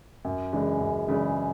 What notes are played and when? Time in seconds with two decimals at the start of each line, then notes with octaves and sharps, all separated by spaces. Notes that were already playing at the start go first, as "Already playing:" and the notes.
0.25 F#2
0.53 C#3 E3 G#3 D4
0.80 F#2
1.08 C#3 E3 G#3 D4